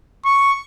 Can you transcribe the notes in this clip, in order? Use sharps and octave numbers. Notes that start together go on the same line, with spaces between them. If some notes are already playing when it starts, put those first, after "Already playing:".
C#6